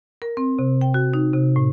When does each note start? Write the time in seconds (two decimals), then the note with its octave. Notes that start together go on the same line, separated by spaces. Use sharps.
0.22 A#4
0.37 C4
0.59 C3
0.81 G5
0.94 F#4
1.14 D#4
1.34 C3
1.56 A2